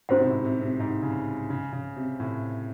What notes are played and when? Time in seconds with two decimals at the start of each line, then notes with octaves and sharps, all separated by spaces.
0.09 G#2 C#4 F#4 C5 F#5
0.18 C3
0.26 A2
0.44 C3
0.61 C3
0.80 G#2
1.03 C#3
1.50 C#3
1.73 C#3
1.96 C3
2.20 A2